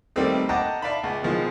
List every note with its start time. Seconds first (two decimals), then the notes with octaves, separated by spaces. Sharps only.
0.16 D#3 G3 A3 A#3 C4 D#4
0.49 D#5 F#5 G5 A5 A#5 D6
0.82 D5 E5 F5 A5 B5
1.03 C#2
1.23 B2 D#3 F3 G#3